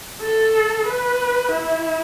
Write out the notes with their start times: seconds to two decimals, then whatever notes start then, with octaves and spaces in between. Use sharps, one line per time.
0.22 A4
0.87 B4
1.52 E4